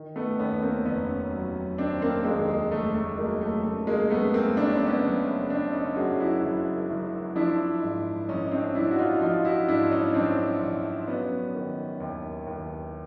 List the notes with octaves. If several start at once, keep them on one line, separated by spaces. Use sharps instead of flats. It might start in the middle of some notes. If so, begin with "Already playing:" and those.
Already playing: D#3
A3 B3
D#2 B3 C#4
A#3 C4
F1 B3 C#4
F#3
D#3 C4 D4
A#3 C4
D#2 G#3 A#3
G#3
F1 A3
A3
F#3 G#3 A#3
A3
C#3 A3
G#3 A#3
F#2 A3 B3
A#3 C4
F#1 D4
C#4
C4
B3 C#4
F#1
C#3 C4 D4
C#4 D#4
F#2 F#4 G#4
E4 F#4
F#1
F#1
F3 D4 E4
G#2
A#1 C#4 D#4
C4 D4
A#1 D4 E4
F#4
D#4 F4
F3 D#4 F4
E4 F#4
G#2 D4 E4
C#4 D#4
A#1 C4 D4
A#1
F#3 B3 C#4
D#3
D#2
D#2